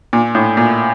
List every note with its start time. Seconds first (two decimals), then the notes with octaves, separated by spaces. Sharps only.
0.13 A#2
0.35 A2
0.57 A#2